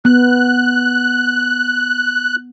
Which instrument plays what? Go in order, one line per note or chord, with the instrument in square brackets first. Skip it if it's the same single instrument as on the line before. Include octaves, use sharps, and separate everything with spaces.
[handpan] B3 [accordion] F#6